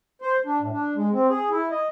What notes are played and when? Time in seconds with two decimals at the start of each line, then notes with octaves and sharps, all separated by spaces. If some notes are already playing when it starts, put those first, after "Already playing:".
0.22 C5
0.45 D4
0.60 A2
0.72 D4
0.96 G#3
1.12 C4
1.29 G#4
1.50 E4
1.72 D#5